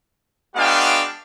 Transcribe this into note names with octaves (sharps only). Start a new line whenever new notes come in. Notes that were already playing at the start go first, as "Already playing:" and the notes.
G#3 B3 D4 F#4 F5 G5